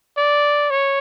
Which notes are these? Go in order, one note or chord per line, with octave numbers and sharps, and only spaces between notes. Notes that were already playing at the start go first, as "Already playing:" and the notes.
D5
C#5